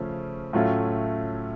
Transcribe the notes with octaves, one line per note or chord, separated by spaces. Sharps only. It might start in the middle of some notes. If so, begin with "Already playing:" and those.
Already playing: C#3 F3 A3 C#4
A2 F#3 A3 C#4 F4